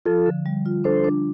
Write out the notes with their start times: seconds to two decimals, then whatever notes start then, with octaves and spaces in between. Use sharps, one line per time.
0.06 F3 F4 A4
0.26 D3
0.46 G3
0.66 F4
0.84 D4 A4 C5
1.05 D4